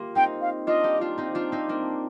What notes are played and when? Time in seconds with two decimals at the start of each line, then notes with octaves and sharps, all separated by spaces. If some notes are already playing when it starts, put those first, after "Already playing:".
Already playing: A#3 F4 G4
0.15 C4 D#4 G5
0.41 F5
0.67 D4 F4 D#5
0.84 D#4 G4
1.01 D4 F4
1.18 C4 D#4
1.35 D4 F4
1.52 C4 D#4
1.69 A#3 D4